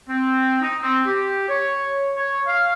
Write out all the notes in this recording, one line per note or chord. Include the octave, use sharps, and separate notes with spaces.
C4
D#4
C4
G4
C#5
C#5
F5